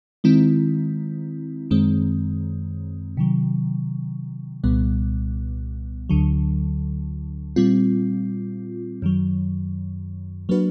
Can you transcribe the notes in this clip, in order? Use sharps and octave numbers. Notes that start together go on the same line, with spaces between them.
D#3 G#3 C4 E4
F#2 D#3 G#3 C4
C3 D#3 F#3
C2 A#2 G3 B3
D2 D3 F#3
A#2 G3 C4 F4
F#2 D#3 F#3
F#3 A#3 D4 F#4 B4